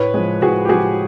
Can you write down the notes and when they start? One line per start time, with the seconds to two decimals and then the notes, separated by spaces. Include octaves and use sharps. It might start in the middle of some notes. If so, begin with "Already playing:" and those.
Already playing: A2 B4 C#5
0.14 F3 G#3
0.41 A2 F#4 G#4
0.65 G4
0.69 F3 G#3 F#4 G#4